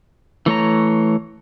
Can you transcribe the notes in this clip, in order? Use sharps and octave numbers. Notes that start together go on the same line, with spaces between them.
E3 A3 C#5 A#5